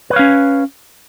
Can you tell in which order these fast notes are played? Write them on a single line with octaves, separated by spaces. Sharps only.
B4 C#5 F5 C#4